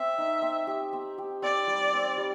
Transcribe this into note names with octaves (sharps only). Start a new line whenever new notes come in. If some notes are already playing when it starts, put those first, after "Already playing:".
Already playing: C4 E5
D#4
C4
G4
C4
G4
C4 D5
G3
C4
G3